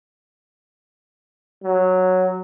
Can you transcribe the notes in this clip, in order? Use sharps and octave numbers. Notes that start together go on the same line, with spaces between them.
F#3